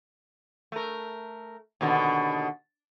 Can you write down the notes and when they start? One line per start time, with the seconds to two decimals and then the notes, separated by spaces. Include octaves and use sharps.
0.72 A3 A#4
1.81 D#2 B2 D3